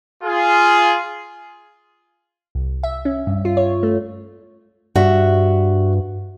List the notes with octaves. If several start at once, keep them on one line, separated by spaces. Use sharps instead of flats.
F4 G#4
C2
E5
C#4
G2
F4
C#5
A3
G2 F#4 E5